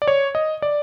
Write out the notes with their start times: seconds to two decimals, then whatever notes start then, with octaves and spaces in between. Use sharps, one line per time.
0.02 D5
0.08 C#5
0.35 D#5
0.62 D5